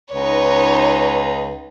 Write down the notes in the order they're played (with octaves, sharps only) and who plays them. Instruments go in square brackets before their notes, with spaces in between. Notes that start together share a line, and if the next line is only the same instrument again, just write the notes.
[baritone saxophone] C#2 [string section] D#4 B4 [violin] C#5